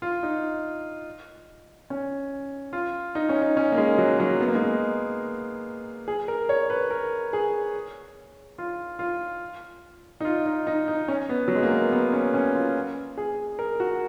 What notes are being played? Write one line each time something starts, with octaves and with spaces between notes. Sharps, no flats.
F4
D#4
C#4
F4
D#4
C#4
D#4
C#4
A#3
G#3
F#3
F#3
B3
A#3
G#3
A#3
G#4
A#4
C#5
B4
A#4
G#4
F4
F4
D#4
F4
D#4
D#4
D#4
C#4
B3
F#3
G#3
A#3
B3
B3
C#4
C#4
F4
G#4
A#4
F#4